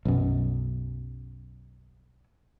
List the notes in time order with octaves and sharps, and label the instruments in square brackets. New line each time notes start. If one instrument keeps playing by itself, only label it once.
[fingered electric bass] B1 F#2